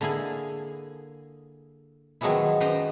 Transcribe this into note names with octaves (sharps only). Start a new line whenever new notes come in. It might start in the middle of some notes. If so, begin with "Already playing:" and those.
D3 A#3 E4 G#4
D#3 F3 F#3 G#3 B3 E4
F#2 B4 C5 D#5 G5 A#5